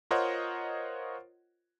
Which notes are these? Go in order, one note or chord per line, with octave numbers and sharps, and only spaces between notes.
F4 A#4 C5 C#5 D#5 F#5